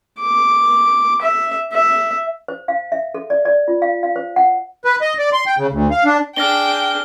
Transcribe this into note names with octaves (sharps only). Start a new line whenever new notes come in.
D6
E5
E5
C5
F5
E5
A4
D5
D5
F4
F5
F5
C5
F#5
B4
D#5
D5
C6
G5
C#3
D2
F5
D4
D4 G#4 G5 F6 A#6 G7